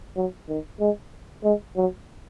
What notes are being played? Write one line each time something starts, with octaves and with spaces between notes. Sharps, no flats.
F#3
D#3
G#3
G#3
F#3